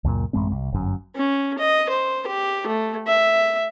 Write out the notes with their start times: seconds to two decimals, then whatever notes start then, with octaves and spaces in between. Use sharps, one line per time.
0.04 C#2 F#2 A#2 A#3
0.33 A1 F#2 G#3 C4
0.52 C2
0.72 G1 F#2
1.16 C#4
1.59 D#5
1.89 C5
2.27 G4
2.67 A3
3.07 E5